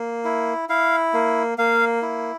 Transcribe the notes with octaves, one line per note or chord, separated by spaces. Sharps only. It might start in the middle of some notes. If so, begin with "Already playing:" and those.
Already playing: A#3
E4
E4 F5
A#3
A#3 F5
E4